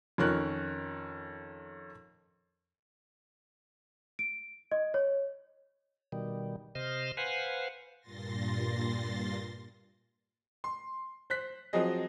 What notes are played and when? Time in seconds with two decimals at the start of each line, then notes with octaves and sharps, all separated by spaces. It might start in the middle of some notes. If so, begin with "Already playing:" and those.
0.18 F2 D#3 C#4 A#4 F#6
4.19 D7
4.72 D#5
4.94 C#5
6.12 B2 D#3 G3
6.75 C3 C5 D#5 F6
7.17 B4 C5 F5 F#5 G#5
8.00 G2 A#2 C6 A6 A#6
10.64 C6
11.30 C5 F#6 B6
11.73 F3 F#3 C4 G#4 D#5